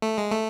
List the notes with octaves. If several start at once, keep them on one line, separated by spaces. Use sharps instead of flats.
A3
G#3
A3